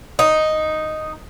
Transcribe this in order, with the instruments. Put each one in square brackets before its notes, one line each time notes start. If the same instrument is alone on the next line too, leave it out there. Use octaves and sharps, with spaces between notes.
[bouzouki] D#4